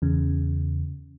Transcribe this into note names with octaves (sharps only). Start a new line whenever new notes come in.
E2 C#3